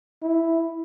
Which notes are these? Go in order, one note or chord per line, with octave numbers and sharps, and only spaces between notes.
E4